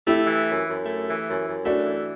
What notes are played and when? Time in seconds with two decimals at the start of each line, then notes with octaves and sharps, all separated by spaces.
0.07 A3 E4 G4
0.26 E3
0.47 F#2
0.66 F#2
0.86 A3
1.06 E3
1.26 F#2
1.46 F#2
1.66 A3 D4 F#4
1.85 E3